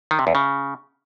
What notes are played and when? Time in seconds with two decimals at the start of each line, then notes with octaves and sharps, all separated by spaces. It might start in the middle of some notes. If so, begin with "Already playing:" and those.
0.11 D#3
0.19 C3
0.27 E2
0.35 C#3